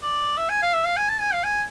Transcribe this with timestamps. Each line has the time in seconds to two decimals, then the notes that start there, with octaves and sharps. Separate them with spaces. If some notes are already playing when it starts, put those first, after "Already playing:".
0.02 D5
0.37 E5
0.49 G#5
0.62 F5
0.73 E5
0.84 F5
0.97 G#5
1.09 A5
1.20 G#5
1.33 F5
1.43 G#5